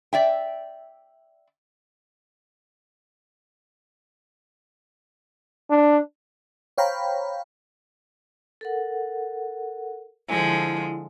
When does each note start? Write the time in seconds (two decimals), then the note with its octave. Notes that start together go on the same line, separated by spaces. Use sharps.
0.13 D5 E5 G5
5.71 D4
6.78 C5 C#5 F5 G5 A#5 B5
8.61 A4 A#4 F#5
10.28 D3 F3 G#3 E4